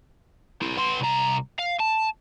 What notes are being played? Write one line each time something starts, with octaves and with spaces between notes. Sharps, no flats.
E4 G4
B3 C6
C2 A#5
F5
A5